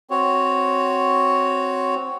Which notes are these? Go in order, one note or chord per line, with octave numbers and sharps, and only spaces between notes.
C4 F#4 C#5